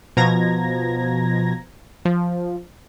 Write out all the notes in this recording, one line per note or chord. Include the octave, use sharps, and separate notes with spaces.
B2 F3 A#5 G#6 A#6
F3